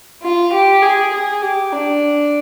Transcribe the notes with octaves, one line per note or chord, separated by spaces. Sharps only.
F4
G4
G#4
G#4
G4
D4